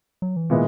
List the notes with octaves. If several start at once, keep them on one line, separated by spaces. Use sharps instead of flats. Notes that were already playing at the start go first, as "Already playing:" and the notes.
F#3
E3
A#2 D#3 G#3 B3 E4